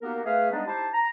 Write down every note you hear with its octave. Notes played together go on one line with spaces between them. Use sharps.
A#3 B3 D#4 F#4 G4 A#4
A3 G#4 B4 F5
G3 G#3 B3 D4 D#4
D#4 E4 G4 C5 A5
A#5